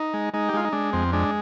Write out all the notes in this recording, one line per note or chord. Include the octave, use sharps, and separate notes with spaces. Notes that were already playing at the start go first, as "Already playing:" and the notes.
Already playing: D#4
G#3
G#3 D#4
G4
G#3 F4
D#4
G#3 D4
F2 C4
G#3 D4